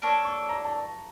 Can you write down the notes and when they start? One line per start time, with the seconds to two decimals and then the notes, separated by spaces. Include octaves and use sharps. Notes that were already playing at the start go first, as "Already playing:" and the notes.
0.02 A#3 D4 A4 C#5
0.25 C#6
0.49 A#5
0.65 A5